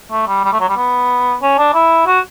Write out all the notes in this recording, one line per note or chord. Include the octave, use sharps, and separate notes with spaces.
A3
G3
G3
A3
F#3
G3
B3
C#4
D4
E4
F#4